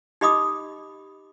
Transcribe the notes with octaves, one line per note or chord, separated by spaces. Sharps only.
D#4 G4 D#5 B5 D6 D#6